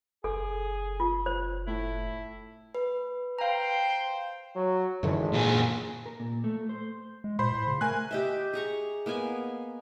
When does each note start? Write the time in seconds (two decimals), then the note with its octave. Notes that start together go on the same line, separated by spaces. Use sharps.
0.24 F#1 G#4 A4
1.00 F4
1.26 C5
1.67 A2 E4
2.75 B4
3.39 C5 F5 G5 A#5
4.55 F#3
5.03 G#1 F#2 D3 E3
5.33 A#2 G#4
6.06 A#4
6.20 A#2
6.44 A3
6.69 C5
7.24 G#3
7.39 A#2 C5 B5 C6
7.52 A2
7.67 C#3
7.81 A3 A#4 G#5 F#6
8.11 G4 D#5 E5
8.53 G#4 A#5 C#6
9.06 A#3 B3 D#5 G#5